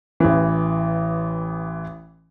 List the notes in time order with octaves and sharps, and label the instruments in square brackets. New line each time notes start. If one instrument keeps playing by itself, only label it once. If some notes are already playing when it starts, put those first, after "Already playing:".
[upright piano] A1 E3